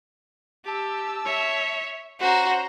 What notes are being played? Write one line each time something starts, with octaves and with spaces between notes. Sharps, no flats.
G4 A5 E6
C#5 E5
C#4 F#4 C5 A#5